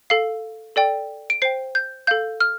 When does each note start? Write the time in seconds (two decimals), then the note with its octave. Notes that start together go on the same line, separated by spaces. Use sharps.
0.10 A4 F5 C7
0.76 A4 D5 G5
1.30 D7
1.42 C5 G5 C7
1.75 G6
2.07 A4 F5 G6
2.40 F6